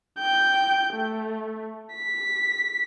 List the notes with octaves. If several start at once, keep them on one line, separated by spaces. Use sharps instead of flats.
G5 G6
A3
B6